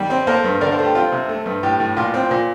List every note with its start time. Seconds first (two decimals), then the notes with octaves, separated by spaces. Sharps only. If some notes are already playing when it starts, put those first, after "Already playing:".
Already playing: D#3 G3
0.10 C4
0.27 A#3 A4 C5
0.44 G2
0.61 D3 A#4 D5
0.72 A4 C5
0.78 A3
0.84 G4
0.95 C4 F4
1.12 C3
1.29 A3
1.46 G2
1.63 A2 G4
1.80 A2
1.97 A#2 F4
2.14 C4
2.31 A#2